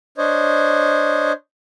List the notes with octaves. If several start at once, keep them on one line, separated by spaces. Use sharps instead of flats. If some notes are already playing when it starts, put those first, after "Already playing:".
D4 C5 C#5 D#5